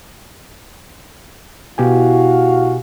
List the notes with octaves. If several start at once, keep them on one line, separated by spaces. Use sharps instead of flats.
B2 E4 F#4 G4 F5 G#5